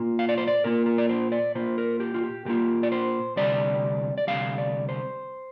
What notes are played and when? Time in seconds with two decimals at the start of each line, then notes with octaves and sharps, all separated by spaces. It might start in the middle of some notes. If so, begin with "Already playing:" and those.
Already playing: A#2 A#3 F4
0.19 F5
0.29 D5
0.38 C5
0.48 D5
0.64 A#2 A#3 F4 A#4
0.86 A#4
0.98 D5
1.09 C5
1.32 D5
1.55 A#2 A#3 F4 C5
1.78 A#4
2.00 G4
2.14 F4
2.23 G4
2.45 A#2 A#3 F4 G4
2.83 D5
2.92 C5
3.36 D2 C3 G3 D5
4.18 D5
4.27 D2 C3 G3 F5
4.58 D5
4.89 C5